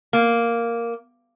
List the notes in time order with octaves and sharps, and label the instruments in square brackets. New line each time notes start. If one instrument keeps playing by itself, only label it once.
[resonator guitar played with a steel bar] A#3